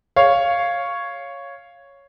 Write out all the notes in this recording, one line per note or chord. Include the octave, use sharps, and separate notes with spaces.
C#5 F5